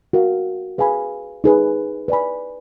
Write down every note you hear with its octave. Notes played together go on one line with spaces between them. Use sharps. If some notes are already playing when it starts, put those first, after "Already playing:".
F#4 A#4 F5
G#4 B4 F5 G#5 B5
D#4 G#4 B4
B4 D5 G#5 B5